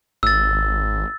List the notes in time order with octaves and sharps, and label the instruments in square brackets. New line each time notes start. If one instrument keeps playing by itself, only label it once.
[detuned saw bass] G#1 [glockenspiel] E6 A6